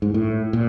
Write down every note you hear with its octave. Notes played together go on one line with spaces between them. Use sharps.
G#2
A2
A#2